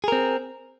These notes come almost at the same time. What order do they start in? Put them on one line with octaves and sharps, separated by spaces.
G#4 A#4 C4